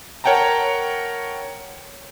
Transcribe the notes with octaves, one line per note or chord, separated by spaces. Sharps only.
A#4 C#5 F#5 G5 A5 A#5